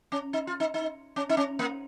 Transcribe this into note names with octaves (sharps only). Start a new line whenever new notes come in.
C#4
D#4
F4
D#4
D#4
C#4
D#4
C#4
A#3